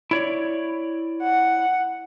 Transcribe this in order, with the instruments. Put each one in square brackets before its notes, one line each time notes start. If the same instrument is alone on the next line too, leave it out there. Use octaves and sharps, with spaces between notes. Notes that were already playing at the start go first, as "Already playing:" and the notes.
[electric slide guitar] E4 C#5 D5
[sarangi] F#5